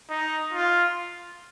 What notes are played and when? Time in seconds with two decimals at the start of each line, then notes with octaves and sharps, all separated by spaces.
0.09 D#4
0.53 F4